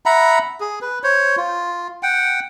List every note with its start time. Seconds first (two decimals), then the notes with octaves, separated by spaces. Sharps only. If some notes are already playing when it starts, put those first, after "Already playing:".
0.06 E5 F#5 A#5 B5
0.60 G#4
0.82 B4
1.04 C5 C#5
1.37 F4
2.03 F#5 G5